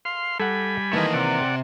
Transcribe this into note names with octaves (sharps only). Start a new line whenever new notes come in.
F5 C6
G3 A4 F#5 G#5 B5
D#3 E3 A3 A#3 D#5
C3 D5 F#5